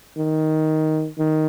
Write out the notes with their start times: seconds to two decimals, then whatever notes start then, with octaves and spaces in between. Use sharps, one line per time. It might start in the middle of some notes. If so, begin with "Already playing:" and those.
0.18 D#3
1.18 D#3